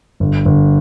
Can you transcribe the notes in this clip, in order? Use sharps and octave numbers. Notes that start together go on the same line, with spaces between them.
G1
G1